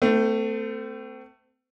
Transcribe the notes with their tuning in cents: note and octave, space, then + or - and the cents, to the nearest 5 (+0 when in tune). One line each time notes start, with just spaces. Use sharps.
A3 +20 C4 -35